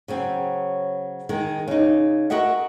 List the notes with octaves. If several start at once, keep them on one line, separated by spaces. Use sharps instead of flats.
C#3 F#3 C4
D#3 G#3
C#3 D#4
F#4 A#4 D#5 E5 F#5